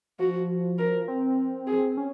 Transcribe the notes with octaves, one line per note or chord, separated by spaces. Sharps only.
F3 F#4
A#4
C4
G#4
C#4